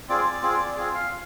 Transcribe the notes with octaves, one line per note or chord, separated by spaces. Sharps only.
C4 F4 G#4 D5
C4 F4 G#4
C4 F4 G#4
F5